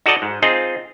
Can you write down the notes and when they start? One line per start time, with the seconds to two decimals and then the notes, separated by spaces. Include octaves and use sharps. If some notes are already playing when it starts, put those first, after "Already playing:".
0.06 D#4 F#4 A4 D5 D#5 A5
0.22 G#2
0.42 C4 D#4 F4 G#4 D#5